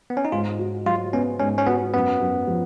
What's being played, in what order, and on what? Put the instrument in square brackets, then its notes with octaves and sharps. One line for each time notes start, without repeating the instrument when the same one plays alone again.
[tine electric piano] B3
C#4
D#4
[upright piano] G#2 [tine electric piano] F4
[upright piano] F#4
[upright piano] F#3 [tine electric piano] F4
[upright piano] B3 [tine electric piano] C#4
[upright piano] G#2 [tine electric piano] C#4
[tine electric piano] C#4
[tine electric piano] B3 [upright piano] F#4
[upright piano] F#2 [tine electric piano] B3
[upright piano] F#2
F3